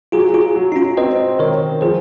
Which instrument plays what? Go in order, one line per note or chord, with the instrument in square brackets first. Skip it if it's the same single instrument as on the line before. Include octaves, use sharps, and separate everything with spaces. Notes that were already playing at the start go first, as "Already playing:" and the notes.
[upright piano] F#3 [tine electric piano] F4 G#4
[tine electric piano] F4 G#4
[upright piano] F#3
[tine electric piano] D#4
C#4 F4
[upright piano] C4 [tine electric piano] C5 D#5
[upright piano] D#3 [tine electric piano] A#4 C#5
[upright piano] F3 [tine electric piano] G#4 C5